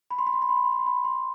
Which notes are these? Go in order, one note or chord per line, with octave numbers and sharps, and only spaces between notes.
B5
C6
B5
C6
B5
C6
B5
C6
B5
C6
B5
C6